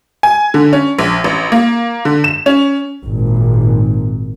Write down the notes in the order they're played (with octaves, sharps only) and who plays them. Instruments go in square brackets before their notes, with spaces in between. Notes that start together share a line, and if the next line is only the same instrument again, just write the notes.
[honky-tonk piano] G#5
D3
C#4
A#1
A1
A#3
D3
E7
C#4
[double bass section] G#1 A#2